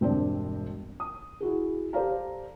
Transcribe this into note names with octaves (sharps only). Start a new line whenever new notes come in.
E1 G2 C4 D4 D5
D#6
E4 F#4 G#4
G4 A4 C5 D5 F5 A#5